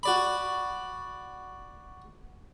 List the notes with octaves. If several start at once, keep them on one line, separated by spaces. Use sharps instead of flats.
F#4 D5 B5